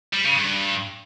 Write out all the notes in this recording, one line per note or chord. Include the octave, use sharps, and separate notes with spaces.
G3
C#3
G2